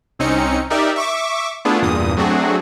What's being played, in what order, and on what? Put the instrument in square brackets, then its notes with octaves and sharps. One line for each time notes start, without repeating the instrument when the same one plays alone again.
[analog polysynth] C2 C4 C#4 D#4 C#7
D#4 G4 A#4 D5 E5
E5 C#6 D6
A3 B3 D4 E4 F4 G#4
E2 G2 A#2 D#6
F#3 A3 C4 D4 F#4 G#4